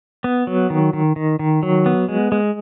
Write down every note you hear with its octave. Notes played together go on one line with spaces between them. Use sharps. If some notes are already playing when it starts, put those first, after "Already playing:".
B3
F#3
D#3
D#3
D#3
D#3
F#3
B3
G#3
G#3